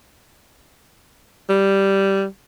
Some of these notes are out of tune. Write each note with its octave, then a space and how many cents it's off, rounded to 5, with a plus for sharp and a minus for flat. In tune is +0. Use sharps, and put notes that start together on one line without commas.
G3 -5